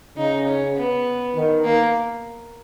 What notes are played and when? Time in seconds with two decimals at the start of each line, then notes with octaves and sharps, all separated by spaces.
0.17 C#3 D#4
0.47 C#4
0.77 B3
1.35 D#3
1.64 A#3